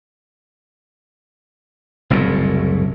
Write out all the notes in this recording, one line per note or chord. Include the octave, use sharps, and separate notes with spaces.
F#1 C2 F#2 A2